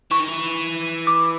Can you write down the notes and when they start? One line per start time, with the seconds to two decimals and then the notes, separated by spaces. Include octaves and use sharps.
0.11 E3 C#6
0.20 D#3
0.28 E3
1.07 D6